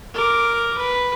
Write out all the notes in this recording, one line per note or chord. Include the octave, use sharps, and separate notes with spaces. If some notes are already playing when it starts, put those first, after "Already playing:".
A#4 D6
B4